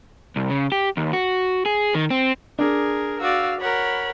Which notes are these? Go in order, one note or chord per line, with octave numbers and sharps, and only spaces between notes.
C2
C#3
G4
D#2
F#4
G#4
D#3
C4
D4 G#4 A#4
F#4 D5 F5 E6
A#4 C#5 F#5 B5